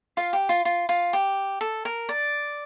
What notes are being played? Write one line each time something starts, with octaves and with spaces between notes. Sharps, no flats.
F4 F5
G4
F4
F4
F4
G4
A4
A#4
D5